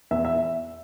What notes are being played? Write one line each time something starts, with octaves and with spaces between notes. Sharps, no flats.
E2 E5
E5